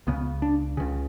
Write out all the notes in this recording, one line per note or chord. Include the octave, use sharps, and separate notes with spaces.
C#2 C#3 B3
D4
C#2 C#3